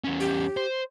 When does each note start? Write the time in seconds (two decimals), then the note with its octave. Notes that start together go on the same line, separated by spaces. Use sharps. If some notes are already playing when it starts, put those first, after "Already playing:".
0.04 E2 C#4
0.20 G4
0.57 C5